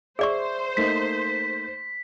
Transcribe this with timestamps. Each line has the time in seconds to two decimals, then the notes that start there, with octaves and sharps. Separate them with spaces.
0.19 G#4 C5 D5 E5 C#6
0.77 A3 A#3 D#4 B6